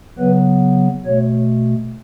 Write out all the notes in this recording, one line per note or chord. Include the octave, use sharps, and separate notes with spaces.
C#3 F#3 B3 B4
B2 A3 C#5